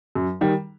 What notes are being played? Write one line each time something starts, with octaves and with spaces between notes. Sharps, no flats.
F#2
D#3 G3